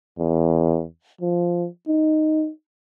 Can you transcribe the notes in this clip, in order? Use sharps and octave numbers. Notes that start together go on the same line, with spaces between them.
E2
F3
D#4